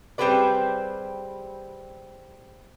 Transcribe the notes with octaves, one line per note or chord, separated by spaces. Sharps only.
G3 C4 G4 G#4 B4 D5